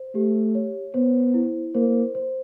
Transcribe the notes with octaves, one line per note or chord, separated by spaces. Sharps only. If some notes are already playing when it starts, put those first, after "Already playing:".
Already playing: C5
A3 G4
C#5
B3 C5
E4
A#3 C5
C5